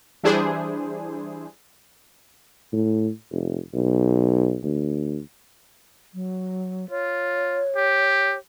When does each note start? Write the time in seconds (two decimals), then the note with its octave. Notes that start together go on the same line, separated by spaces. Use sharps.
0.23 E3 G3 D4 E4 G#4 C5
2.73 A2
3.32 F1
3.74 B1
4.64 D2
6.14 F#3
6.90 F4 C#5
7.76 G4